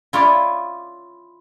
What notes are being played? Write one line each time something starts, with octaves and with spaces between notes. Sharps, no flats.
E4 F4 C#5 D5